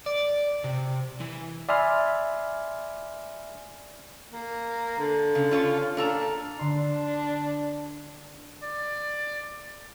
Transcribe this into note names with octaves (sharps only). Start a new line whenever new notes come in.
D5
C3
E3
D5 E5 G#5 B5 C6 F6
A#3
D3
C#3
C#4 F4 C#5
A#3 D4 A4 A#5
D3 D4 C6
D5